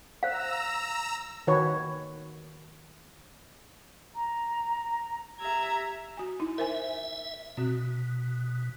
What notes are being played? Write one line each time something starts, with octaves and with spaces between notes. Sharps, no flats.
C5 F5 A#5 E6
D#3 F#4 B4 C#5
A#5
G4 E5 A#5 G#6
F#4 G#5
D#4 E4
A#4 C5 E5 G#5
B2 C4 F#4